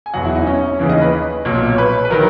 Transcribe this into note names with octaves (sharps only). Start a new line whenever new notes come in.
G#5
E1 E2 B2 F#3 F#4 F#5
E4 E5
D#4 D#5
C#4 C#5
D#2 C#3 E3
D#4 D#5
B4
B1 A#2 F#3
C#5
B4
B4
D#3 F#3 A#4